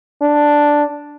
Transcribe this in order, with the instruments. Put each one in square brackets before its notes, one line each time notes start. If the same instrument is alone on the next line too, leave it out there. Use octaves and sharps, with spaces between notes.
[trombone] D4